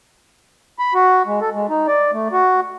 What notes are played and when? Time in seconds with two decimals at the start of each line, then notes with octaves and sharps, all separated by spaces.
0.79 B5
0.94 F#4
1.27 G#3
1.41 A4
1.55 G#3
1.70 D#4
1.87 D5
2.13 A3
2.32 F#4